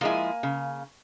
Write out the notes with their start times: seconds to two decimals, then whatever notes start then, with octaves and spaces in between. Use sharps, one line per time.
0.01 F3 G#3 A#3 E4 G#5
0.43 C#3